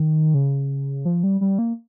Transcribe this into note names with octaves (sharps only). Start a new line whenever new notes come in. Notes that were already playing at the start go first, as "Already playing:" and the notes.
Already playing: D#3
C#3
F3
G3
G3
A#3